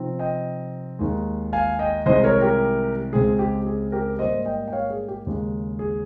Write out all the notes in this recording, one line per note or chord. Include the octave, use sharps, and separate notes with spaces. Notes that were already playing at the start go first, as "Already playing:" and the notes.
Already playing: C3 F3 C4 D#4
D#5 G5
D#2 D#3 G#3
F5 G#5
D#5 G5
C2 C3 D#3 G#3 C5 D#5
A#4 C#5
G4 A#4
C#2 C#3 G#3 C4 G#4
G4
G#4
G4 A#4
G#2 G3 A#3 C5 D#5
D#5 G5
G5
C#5 F5
G#4
G4
D#2 C#3 G#3
G#4